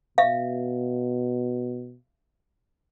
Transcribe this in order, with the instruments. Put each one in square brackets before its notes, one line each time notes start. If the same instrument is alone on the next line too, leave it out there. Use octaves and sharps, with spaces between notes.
[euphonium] B2 [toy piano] E5 F5